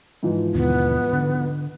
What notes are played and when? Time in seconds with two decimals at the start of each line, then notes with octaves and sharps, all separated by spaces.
0.23 G#2 E3 F3
0.54 D#2 B2 D3 B3
1.13 D3